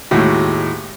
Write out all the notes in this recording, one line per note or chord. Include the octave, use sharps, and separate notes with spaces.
D#2 A2 G#3 F#4